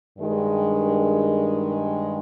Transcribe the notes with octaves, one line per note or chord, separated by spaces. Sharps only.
G2 D#3 G#3